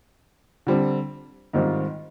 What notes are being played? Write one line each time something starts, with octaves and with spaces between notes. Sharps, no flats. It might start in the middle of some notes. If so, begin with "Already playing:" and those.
D3 G3 C4
G#2 D#3 G3 C4 F4